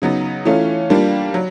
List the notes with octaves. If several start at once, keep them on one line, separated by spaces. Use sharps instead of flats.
C#3 F#3 B3 D#4
E3 A3 C#4 F4
G3 A#3 D4 F4
F#3